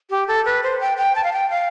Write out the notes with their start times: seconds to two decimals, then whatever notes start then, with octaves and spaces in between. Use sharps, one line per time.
0.10 G4
0.28 A4
0.45 B4
0.63 C5
0.80 G5
0.97 G5
1.15 A5
1.24 F5
1.33 G5
1.50 F5